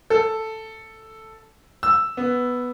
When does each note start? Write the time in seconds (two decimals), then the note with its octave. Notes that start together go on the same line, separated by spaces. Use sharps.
0.10 A4
1.83 E6
2.17 B3